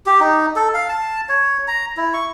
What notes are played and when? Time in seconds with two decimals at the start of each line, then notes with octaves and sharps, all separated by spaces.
0.06 G4
0.20 D#4
0.56 A4
0.74 F5
0.89 A5
1.29 C#5
1.68 A#5
1.97 E4
2.14 C#6